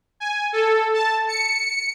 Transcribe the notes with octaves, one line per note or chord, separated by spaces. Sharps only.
G#5
A4
A5
C#7